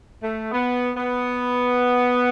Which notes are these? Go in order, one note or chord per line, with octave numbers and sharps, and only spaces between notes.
A3
B3
B3